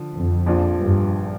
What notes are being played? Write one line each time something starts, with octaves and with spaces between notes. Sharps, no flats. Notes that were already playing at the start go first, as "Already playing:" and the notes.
Already playing: D3 F3
F2
A#1 A#2 F3 D4 F4
G2